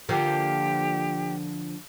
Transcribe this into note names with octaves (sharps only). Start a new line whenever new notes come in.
D3 F3 A#3 G4